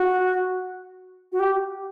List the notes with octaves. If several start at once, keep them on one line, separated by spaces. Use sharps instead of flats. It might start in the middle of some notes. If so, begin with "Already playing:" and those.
Already playing: F#4
F#4
G4